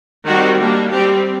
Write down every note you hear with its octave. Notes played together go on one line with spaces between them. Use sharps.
D#3 G3 C4 F#4
G3 A#3 D4
C4 G4
G3